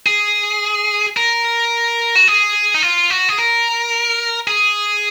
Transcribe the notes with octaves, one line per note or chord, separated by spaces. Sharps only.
G#4
A#4
F#4
G#4
D#4
F4
F#4
G#4
A#4
G#4